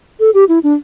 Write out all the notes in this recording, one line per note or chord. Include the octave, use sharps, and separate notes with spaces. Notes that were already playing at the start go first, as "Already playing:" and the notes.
A4
G4
E4
D4